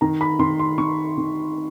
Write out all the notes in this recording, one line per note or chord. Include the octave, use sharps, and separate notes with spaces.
D#3 A#5
B5
D#3 C6
C6
D#3 C#6
D#3